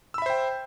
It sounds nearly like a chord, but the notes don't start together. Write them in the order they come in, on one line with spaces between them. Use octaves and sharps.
E6 B5 E5 C5 G5